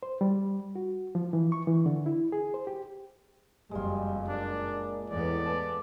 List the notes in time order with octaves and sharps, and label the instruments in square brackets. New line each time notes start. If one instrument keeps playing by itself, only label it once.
[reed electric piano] C5
G3
F#4
F3
E3
C#6
E3
D3
E4
G#4
C5
G4
[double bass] F#1 F2 [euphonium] G3 [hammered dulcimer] G#3 F4
[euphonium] A#2 [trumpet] D4
[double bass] E2 B3 [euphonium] A2 [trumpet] D5
[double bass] B3 [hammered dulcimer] A5